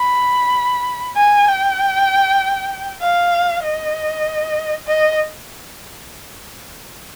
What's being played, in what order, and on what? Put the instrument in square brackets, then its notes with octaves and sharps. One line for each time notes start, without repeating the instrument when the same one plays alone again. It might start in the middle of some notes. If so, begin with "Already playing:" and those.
Already playing: [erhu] B5
G#5
G5
F5
D#5
D#5